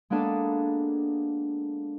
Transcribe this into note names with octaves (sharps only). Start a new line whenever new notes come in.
G#3 A#3 B3 D4 G#4 A4